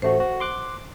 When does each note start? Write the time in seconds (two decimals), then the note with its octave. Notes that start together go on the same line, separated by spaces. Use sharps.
0.02 A1 A3 F#4 C5
0.20 F#4
0.40 C6 D6 F#6